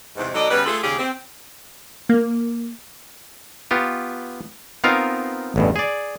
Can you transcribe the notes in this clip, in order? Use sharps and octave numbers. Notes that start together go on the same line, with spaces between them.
E2 G#2 C3
B2 F#3 D#4 A4 D5 D#5
C#3 G3 B3 C#4 B4
A3 F4 G#4 A4
D#2 C#3 G4 G#4 F5
C4
A#3
B3 F4 G4
B3 C4 D#4 F4 A#4 F5
A1 E2 G2
G#4 D5